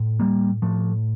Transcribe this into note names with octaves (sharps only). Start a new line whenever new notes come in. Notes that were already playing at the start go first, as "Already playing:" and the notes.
Already playing: A2
G3 A#3
A2 F3 A3